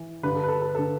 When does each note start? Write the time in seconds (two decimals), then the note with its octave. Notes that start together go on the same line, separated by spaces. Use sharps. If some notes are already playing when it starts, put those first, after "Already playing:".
Already playing: E3
0.23 G2 D3 B4
0.36 A4
0.43 B4
0.48 A4
0.62 A4
0.69 B4
0.75 D3 A4